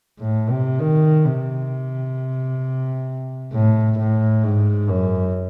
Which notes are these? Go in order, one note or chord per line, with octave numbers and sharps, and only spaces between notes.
A2
C3
D#3
C3
A2
A2
G#2
F#2